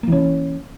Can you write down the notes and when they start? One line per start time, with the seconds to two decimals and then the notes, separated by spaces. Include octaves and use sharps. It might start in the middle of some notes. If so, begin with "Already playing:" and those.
0.03 A#3
0.08 E3
0.12 C#4